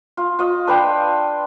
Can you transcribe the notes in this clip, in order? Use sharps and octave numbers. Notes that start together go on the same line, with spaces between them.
F4
F4 D#5
D4 B4 F5 G5